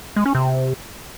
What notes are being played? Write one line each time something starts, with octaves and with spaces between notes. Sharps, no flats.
G#3
C#4
C3